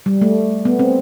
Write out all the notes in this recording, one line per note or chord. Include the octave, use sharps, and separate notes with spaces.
G3
A3
B3
C4